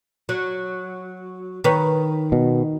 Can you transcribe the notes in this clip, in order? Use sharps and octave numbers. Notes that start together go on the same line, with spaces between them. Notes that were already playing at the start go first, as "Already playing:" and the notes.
F#3
D#3 B4 C#5
B2